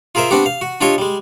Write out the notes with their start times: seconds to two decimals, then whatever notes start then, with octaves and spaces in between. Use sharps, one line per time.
0.15 F4 G#4 A#4 C5 E5
0.31 B3 C4 D4 F#4 G4
0.46 F5
0.61 F#4
0.81 D4 F4 G4 C#5 D#5
0.98 G3 G#3